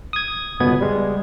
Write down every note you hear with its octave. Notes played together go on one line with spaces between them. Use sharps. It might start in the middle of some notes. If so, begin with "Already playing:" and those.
D#6 G#6
G1 C#2 B2 B3 G#6
G3 G#3